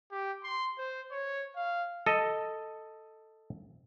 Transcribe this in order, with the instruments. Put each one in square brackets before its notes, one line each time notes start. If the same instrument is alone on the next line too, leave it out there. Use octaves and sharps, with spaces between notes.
[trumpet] G4
C6
C5
C#5
F5
[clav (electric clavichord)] A4 D#5